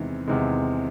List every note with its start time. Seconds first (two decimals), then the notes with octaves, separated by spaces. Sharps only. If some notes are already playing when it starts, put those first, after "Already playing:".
Already playing: E2 C3 D#3 G#3
0.28 E2 C3 D#3 G#3